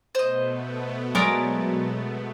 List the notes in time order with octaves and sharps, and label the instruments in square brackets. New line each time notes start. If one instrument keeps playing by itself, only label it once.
[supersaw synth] B2 A3 B3 [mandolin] C5 D#5
[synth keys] F#3 A6 [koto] G#3 A#4 D5